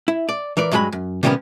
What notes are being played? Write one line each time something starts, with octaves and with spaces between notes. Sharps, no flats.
E4
D5
E3 A#4 D5
G2 F#3 G#3 A4 G#5 B5
F#2
C3 D#3 G3 B3 C#4 A#4